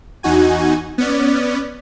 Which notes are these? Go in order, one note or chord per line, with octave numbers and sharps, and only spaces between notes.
E2 D#4 F#4 G#5
B3 C#4 D5